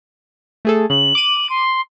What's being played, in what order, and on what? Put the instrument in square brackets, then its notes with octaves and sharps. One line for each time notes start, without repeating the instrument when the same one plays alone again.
[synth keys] A3 G#4 A4
[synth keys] C#3 [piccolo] F#7
[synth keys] D6 D#7
[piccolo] C6